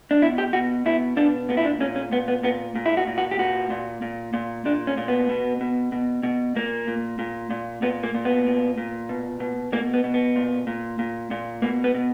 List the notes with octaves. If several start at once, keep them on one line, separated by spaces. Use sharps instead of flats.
D4
B2 E4
G4
B2 F#4
B2 E4
B2 D4
A#2 B3
E4
D4
A#2 C#4
C#4
A#2 B3
B3
A#2 B3
A#2
E4
F#4
A#2
F#4
G4
A#2 F#4
A#2
A#2
A#2
A#2 D4
C#4
A#2
B3
B2
B2
B2
B2
A#2 A#3
A#2
A#2
A#2
A#2 B3
A#3
A#2
B3
A#2
A#2
B2
B2
B2 A#3
B3
B2
B3
A#2
A#2
A#2
A#2
B2 A#3
B3
B2